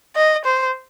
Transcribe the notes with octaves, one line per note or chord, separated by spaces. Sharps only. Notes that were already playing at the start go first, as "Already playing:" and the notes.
D#5
C5